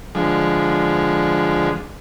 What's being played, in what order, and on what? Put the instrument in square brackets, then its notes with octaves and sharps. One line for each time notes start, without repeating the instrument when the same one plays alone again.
[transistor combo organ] D3 F3 G#3